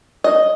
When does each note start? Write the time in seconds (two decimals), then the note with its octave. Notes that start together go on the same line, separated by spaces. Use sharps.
0.24 D#5